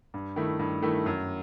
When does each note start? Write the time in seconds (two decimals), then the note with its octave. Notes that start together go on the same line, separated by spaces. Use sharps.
0.14 G2
0.36 D#3 A3 E4
0.59 G2
0.82 D#3 A3 E4
1.06 F#2